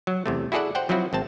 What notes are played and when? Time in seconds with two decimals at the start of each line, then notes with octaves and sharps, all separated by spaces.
0.07 F#3
0.26 E2 C3 A3
0.52 E4 F#4 G#4 A4 D5 F#5
0.75 C5 F#5 G5
0.89 F3 F#3 C4 E4 F#4
1.13 G#1 C4 A5